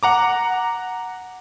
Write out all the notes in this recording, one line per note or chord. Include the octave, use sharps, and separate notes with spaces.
F#5 A#5 D6